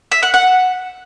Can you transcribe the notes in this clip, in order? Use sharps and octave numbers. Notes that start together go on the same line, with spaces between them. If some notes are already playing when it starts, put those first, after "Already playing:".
E5
F#5
F#5